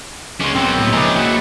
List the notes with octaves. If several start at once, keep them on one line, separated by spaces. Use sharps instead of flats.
C#2 A#3 C#4 D4 C6
B1 B2 C4 A#4 F#5
A2 A#3 G#4
C#2 C#3 E3 F3 D4 D#5 A#5
F#3 A3 F#4 B4